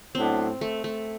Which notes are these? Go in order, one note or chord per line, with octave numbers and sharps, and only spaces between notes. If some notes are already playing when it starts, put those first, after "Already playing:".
A2 F#3 B3 C4 D4
A3
A3